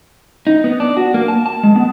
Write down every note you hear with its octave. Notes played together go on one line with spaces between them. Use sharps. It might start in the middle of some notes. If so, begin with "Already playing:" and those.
D#4
B3
D4
F#4
A#3
A5
A5
G#3
B3